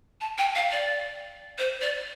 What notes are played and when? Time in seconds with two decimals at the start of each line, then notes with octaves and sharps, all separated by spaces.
0.21 A5
0.38 G5
0.55 F5
0.72 D5
1.58 C5
1.81 D5